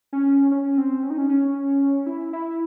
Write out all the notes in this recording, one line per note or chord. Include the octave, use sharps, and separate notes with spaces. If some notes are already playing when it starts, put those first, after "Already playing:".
C#4
C#4
C4
C#4
D#4
C#4
C#4
E4
E4